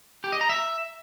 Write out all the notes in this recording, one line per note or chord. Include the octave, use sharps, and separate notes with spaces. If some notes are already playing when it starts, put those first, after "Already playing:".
G4
D#5
A#5
E5